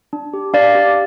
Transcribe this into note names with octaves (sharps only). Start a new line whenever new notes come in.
D4
G4
D4 D5 F5
G4